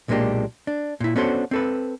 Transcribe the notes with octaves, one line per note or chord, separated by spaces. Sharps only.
B1 A#2 G#3 A#3 D4 G4
D4
A#2 E4
B3 C#4 D4 F#4 A4 C5
C4 A4 B4